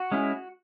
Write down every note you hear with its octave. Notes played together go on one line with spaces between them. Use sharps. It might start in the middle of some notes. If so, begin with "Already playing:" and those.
Already playing: F#4
G#3 C#4 E4